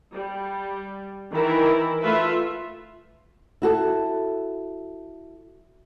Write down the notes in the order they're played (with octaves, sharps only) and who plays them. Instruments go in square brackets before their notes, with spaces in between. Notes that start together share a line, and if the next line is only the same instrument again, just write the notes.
[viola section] G3
D#3 E3 E4 A#4
A3 F4 B4 E5
[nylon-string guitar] E4 F#4 A4